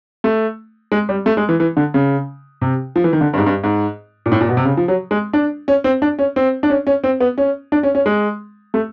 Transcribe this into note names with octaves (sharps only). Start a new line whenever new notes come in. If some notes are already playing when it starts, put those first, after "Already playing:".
A3
G#3
G3
A3
G#3
E3
E3
D3
C#3
C3
F3
E3
D#3
D3
G2
G#2
G2
G#2
A#2
A2
A#2
B2
C3
C#3
F3
F#3
G#3
D4
C#4
C4
D4
C#4
C4
D4
C#4
C#4
C4
B3
C#4
D4
C#4
C#4
G#3
A3